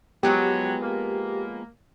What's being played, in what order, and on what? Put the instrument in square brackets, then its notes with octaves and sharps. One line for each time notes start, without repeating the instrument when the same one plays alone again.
[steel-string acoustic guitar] F3 G#3 B3 [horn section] F#3 [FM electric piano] G4
[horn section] A#3